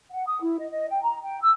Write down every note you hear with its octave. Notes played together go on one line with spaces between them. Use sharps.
F#5
D#6
E4
D#5
D#5
G5
A#5
G5
E6